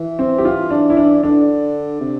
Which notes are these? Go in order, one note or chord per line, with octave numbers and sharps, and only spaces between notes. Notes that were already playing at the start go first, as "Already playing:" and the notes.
Already playing: E3
C4
G4
F4
D4
E4
D4
D3 D4
C3